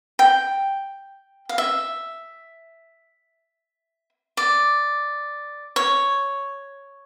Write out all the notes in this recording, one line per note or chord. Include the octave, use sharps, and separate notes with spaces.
G5
F5
E5
D5
C#5